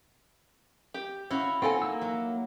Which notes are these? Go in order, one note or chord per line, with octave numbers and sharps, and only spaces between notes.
G4
C#4 E4 F#4 F5
C4 D#4 F4 A4 G#5
A#3 E6
F#3